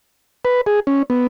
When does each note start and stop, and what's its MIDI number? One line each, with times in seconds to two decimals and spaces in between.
0.45 0.61 71
0.66 0.80 68
0.87 1.03 61
1.10 1.27 59